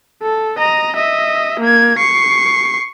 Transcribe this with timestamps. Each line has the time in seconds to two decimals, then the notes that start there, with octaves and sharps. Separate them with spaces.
0.22 A4
0.59 D#5 A#5
0.96 D#5 E5
1.60 A#3 G#6
1.98 C#6 C7